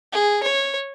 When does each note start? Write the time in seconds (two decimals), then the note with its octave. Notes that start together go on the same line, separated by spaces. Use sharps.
0.12 G#4
0.43 C#5